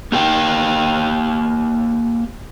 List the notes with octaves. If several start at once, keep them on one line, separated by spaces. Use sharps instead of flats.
A#3 G4 F5 G5